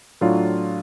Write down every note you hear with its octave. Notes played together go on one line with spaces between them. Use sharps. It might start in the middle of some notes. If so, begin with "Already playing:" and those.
A2 F#3 D4 F4